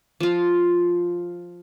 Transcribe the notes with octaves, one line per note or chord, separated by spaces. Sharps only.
F3 F4